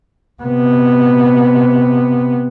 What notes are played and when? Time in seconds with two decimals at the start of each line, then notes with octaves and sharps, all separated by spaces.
0.42 C3 B3